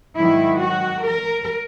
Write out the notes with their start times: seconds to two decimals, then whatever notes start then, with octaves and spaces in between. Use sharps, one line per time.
0.16 G#2 D#3 F#3 E4
0.60 F#4
1.04 A#4